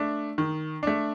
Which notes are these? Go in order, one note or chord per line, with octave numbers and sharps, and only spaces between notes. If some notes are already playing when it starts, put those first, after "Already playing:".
Already playing: A3 D4
D#3
A3 D4